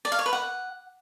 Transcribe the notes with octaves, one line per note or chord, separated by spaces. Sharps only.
D5
F5
C#5
B4
F#5